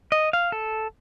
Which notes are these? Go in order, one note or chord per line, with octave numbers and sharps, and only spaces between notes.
D#5
F5
A4